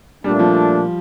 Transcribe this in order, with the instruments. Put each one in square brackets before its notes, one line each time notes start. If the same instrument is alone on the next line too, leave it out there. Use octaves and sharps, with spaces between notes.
[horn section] A#2 A3 D4 [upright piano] G3
[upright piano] F3